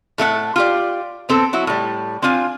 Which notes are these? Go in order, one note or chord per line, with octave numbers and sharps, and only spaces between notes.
A2 A3 D#4 F#5
F4 G4 D5
B3 C4 A4
F#3 E4 F#4
A2 G3
C4 D4 F4 G#5